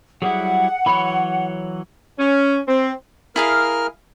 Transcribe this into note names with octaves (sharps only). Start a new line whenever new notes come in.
F#3 G3 E4 G#4 F#5
E3 F#3 C#5 B5
C#4
C4
E4 G#4 A#4 F5 F6